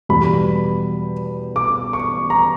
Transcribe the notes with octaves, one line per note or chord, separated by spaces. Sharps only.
E2 B2 G3 B5
D6
C#6
A#5